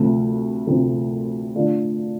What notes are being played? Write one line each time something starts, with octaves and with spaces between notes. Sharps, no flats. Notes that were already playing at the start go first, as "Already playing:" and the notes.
Already playing: D2 C3 F3 A3 C4
D2 C3 F3 A3 C4
D3 A3 D4 F4